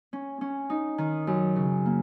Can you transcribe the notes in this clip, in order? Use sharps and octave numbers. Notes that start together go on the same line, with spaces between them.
C#4
C#4
D#4
D#3
F#2
C#3
A#3